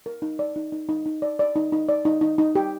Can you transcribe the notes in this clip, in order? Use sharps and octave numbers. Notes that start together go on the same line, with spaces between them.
A#4
D#4
D5
D#4
D#4
D#4
D#4
D5
D5
D#4
D#4
D5
D#4
D#4
D#4
G4